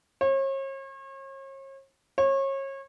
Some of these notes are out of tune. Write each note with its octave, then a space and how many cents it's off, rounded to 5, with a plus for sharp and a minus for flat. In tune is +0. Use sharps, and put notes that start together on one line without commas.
C#5 -40
C#5 -30